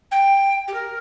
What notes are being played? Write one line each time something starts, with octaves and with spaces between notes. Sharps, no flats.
G5
G4
A#4